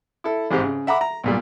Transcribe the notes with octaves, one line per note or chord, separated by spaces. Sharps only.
E4 A4
A1 G#2 C4 G4
C#3
E5 F#5 A#5 B5 D6
A#5
B1 A#2 G3